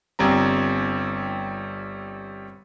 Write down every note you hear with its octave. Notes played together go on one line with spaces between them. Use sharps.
G1 G3 C4 A#5